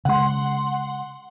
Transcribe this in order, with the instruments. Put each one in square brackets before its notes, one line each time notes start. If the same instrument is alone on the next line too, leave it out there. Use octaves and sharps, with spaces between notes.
[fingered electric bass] C#3 G#3 [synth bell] F#5 C6